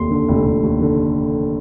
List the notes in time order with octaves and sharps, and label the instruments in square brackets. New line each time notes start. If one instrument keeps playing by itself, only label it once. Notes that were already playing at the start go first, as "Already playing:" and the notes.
Already playing: [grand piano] F1 D#2 C6
D3
F1
F1
D#2
D3